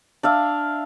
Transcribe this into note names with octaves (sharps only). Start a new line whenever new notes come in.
D4 E5 F5